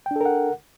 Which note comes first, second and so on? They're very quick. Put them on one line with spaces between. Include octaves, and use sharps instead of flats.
G5 D4 A4 A#4 F#5